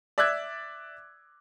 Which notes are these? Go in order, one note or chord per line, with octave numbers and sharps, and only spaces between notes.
D5 E5 D6 E6 F#6 G#6